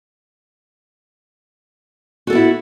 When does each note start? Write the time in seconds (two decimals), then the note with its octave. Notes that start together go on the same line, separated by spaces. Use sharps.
2.27 F#4
2.30 A4
2.33 B3
2.35 E4